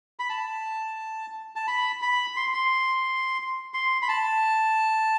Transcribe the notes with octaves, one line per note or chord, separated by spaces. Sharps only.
B5
A5
A5
B5
B5
C6
C6
C6
B5
A5